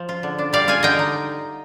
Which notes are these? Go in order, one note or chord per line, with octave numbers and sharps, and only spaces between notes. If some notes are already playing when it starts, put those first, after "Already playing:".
Already playing: F3
F4
D3
D4
G3 D5 F5
F4 F5 G#5
D3 D#5 G5
D#4